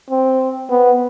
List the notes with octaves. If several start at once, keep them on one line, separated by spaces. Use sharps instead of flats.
C4
B3